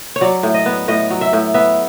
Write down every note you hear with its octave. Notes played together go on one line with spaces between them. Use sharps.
C#5
F#3 D5
A2
D#5
B3
A2 D#5
F#3
E5
A2
B3 E5